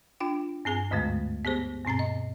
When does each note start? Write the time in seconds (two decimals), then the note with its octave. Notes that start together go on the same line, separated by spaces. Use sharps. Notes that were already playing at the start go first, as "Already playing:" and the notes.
0.20 D4 F4 G5
0.65 G2 C4 G#4 G#5
0.91 D2 G#2 D3 G#3 A3
1.45 B3 G4 G#4 C5
1.85 G2 B2 C4 A#5 A6
1.99 D#5